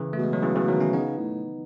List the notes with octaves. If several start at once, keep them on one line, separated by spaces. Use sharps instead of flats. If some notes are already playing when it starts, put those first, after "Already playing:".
Already playing: C#3 E3
B2 A3
G#3
F#3
C#3 E3
C#3 E3
D#3 F#3
C#4 E4
C#3 B3 D#4
A2